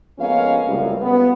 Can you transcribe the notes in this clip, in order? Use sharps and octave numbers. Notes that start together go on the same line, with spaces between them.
F2 G#3 A#3 B3 C#4 F5
C#2 F#2 A2 C3 G3
B3